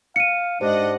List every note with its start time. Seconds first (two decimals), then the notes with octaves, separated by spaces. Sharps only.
0.16 F5 C#7 D#7
0.61 G#2 D4 G4 C5 D#5 F#5